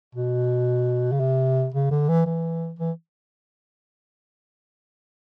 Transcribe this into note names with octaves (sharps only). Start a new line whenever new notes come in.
B2
C#3
C3
C#3
D3
E3
E3
E3